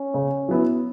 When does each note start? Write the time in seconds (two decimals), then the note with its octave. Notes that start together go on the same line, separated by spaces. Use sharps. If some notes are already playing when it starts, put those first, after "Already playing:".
Already playing: C#4
0.14 C#3
0.49 F#3 B3 E4